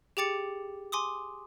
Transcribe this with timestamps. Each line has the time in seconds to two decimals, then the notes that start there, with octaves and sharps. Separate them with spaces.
0.17 G4 G#4 G5 D6 A6 C#7
0.92 G#5 C6 D6 D#6